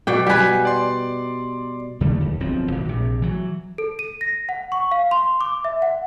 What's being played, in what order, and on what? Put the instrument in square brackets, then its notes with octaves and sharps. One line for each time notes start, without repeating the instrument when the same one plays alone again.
[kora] B2 D5 G5
[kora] G3 B4 [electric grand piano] F#5 G#5
[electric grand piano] D5 C6
[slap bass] D#2 D3 G3 A3
D#2
D1 B1 F3 C4
G#1 B2
A#1 C3
E3 F#3
[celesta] A4
D#7
A#6
F#5
C#6
F5
C6
D6
E5
F#5